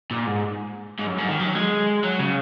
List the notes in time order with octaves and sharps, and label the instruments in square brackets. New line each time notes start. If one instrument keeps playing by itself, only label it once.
[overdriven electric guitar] A#2
G#2
G#2
F#2
G#2
D#3
F#3
G#3
F#3
C#3